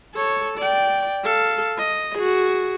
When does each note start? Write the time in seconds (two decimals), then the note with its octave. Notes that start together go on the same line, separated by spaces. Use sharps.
0.15 A4 C#5
0.58 D5 G5
1.24 A4 F5
1.78 D#5
2.15 F#4 G#4